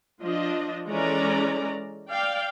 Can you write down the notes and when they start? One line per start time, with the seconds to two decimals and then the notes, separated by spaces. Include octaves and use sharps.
0.21 F3 D4 D#5
0.88 E3 G#3 C#4 A4 D5 A#5
2.09 D5 F5 G5